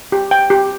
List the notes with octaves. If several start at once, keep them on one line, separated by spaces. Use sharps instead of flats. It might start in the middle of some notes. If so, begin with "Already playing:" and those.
G4
G5
G4